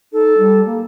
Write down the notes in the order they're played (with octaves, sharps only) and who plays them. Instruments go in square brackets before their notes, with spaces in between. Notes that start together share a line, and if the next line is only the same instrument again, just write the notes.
[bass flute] D#4 [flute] A4
[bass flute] G3
A#3